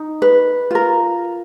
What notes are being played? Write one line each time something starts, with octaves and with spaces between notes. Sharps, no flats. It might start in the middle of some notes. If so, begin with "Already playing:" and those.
Already playing: D#4
B4
F4 A#4